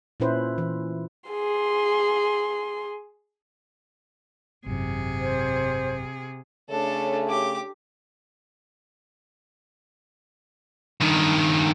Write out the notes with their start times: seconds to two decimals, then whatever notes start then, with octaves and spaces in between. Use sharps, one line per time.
0.20 A#2 C#4 E4 B4 C5
0.58 E3
1.30 G#4 C6
4.66 G#1 F#2 C3 G#4
5.20 C5
6.70 C#3 A3 D4 A4 C#5
7.29 G4 D6
11.00 G2 D#3